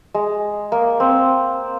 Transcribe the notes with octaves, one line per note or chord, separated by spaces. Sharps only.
G#3
A#3
C4